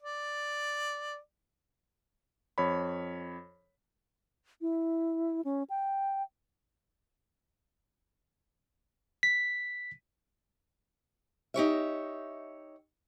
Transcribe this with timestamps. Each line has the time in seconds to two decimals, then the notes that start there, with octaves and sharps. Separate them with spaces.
0.03 D5
2.58 F2 C#5 B5
4.61 E4
5.45 C#4
5.70 G5
9.23 B6
11.54 D#4 G4 C#5 E5